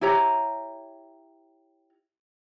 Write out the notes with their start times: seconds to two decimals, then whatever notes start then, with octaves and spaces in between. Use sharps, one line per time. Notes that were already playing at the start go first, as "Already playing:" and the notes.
0.01 E4 G4 C#5 A#5